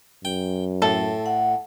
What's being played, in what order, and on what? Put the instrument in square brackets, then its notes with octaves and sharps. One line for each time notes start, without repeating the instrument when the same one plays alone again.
[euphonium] F#2 [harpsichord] G5
[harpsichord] A2 [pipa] A4
[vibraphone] F#5